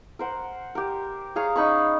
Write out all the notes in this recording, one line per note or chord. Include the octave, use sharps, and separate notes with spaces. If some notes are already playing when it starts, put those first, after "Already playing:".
A#4 C5 F#5
G4 A#4
G#4 C#5 F5 A#5
C#4 D#4 B5 C#6